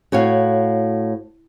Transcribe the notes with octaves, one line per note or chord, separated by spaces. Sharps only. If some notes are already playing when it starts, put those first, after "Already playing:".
A2 F#4 C#5 F5